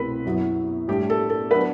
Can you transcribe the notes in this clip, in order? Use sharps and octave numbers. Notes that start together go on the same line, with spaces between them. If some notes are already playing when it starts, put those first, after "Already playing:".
Already playing: C2 B2 A3 C4 E4 B4
F#2 F#3 B3 E4
A2 G3 D4 G4
A4
A4
F#3 B3 D4 B4